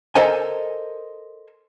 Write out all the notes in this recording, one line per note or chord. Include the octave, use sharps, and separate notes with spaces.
A4 A#4 C5 D#5 G#5